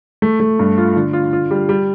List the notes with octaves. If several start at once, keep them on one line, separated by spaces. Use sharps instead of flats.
A3
A3
G2
F4
D3
F4
F4
G3
G3